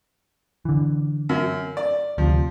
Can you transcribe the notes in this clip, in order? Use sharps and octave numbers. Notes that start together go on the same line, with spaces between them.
D3 E3
F#2
D5
D2 C3 F3